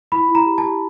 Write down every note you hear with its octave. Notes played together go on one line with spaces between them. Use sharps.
E4 B5
E4
A#5
G4
A5
G4